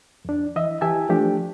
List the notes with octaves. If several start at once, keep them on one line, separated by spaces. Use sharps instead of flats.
F2 D4
E3 D#5 E5
E3 G4 E5 G#5 A5
F3 A3 D4 G4